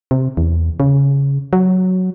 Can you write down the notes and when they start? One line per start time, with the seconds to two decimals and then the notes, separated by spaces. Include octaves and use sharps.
0.11 C3
0.37 E2
0.80 C#3
1.53 F#3